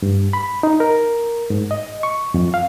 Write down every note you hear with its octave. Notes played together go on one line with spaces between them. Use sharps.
G2
B5
D#4
A#4
G#2
D#5
C#6
F2
F5